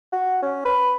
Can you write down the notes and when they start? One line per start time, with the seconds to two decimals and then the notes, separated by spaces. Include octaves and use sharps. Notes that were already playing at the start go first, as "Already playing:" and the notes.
0.13 F#4
0.42 C#4
0.65 B4